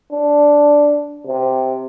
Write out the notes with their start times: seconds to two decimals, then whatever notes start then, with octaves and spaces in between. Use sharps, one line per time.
0.11 D4
1.26 C3